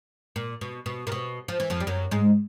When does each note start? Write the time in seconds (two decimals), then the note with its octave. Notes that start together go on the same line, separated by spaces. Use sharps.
0.36 A#2
0.61 B2
0.86 B2
1.07 A#2
1.12 B2
1.48 F3
1.60 E3
1.70 F2 F3
1.80 G3
1.87 F#2 F#3
2.11 G#2 G#3